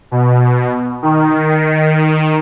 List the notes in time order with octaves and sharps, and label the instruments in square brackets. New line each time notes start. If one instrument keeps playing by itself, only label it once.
[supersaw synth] B2
D#3